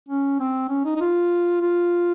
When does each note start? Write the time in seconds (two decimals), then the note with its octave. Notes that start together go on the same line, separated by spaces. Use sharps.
0.09 C#4
0.40 C4
0.69 C#4
0.85 D#4
0.96 D#4
1.01 F4
1.61 F4